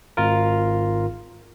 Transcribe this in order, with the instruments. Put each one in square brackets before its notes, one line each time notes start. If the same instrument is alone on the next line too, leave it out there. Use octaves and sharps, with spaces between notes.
[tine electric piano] G#1 F4 A#4